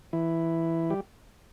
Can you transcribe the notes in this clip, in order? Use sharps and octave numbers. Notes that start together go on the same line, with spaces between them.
E3 E4
G3 G4